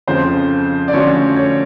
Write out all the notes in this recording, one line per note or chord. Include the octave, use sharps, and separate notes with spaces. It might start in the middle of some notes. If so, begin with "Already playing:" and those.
F2 C#3 F3 C5
D5
D3 F3 A3 C#4 F#4 C#5
C#5